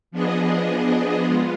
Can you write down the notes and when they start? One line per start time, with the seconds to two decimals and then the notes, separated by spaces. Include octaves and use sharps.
0.11 F3 B3 D4 G#4 D#5
1.23 G#3 B3 F4